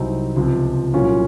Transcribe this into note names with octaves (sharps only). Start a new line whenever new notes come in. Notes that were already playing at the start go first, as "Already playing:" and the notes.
Already playing: C2 C3 F#3 C4 D#4
C#2 C3 F3
C2 A#2 F#3 C#4 F4